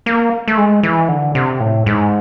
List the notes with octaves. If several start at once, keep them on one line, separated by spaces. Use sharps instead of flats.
A#3
A3
G#3
E3
D3
C3
A2
G#2